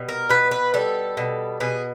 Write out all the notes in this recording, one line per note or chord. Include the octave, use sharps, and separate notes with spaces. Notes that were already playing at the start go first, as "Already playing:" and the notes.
Already playing: B2 G3
A#4
B2 B4
B4
G3 A4
B2
B2 G#4